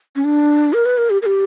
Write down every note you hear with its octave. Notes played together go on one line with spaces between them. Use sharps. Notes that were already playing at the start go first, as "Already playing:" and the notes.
C#4
D4
A#4
B4
A#4
G4
A#4
G4